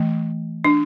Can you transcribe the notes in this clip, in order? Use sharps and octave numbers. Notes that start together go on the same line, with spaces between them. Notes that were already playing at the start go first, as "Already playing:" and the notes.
Already playing: E3 A3
D4